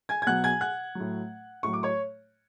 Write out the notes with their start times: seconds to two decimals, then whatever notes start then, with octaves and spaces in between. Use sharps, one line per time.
0.09 G#5 G#6
0.22 G#6
0.26 B2 F#3 F#5 F#6
0.44 G#5 G#6
0.61 F#5 F#6
0.95 A2 F#3
1.63 A2 F#3 C#6
1.73 D6
1.83 C#5 C#6